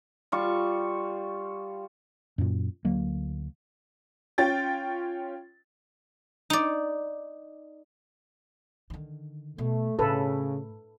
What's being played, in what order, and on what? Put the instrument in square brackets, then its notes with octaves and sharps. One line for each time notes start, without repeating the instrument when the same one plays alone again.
[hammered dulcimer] G3 F4 C#6
[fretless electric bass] F#2 A#2
D2 F#3 A#3
[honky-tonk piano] C#4 F4 G5 A6
[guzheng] D#4 D5
[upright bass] D3 D#3
[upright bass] B2 [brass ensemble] A3
[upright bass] A2 [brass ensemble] C#3 [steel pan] A4 B4